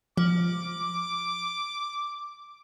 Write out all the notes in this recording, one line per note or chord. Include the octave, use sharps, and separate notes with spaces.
F3 D6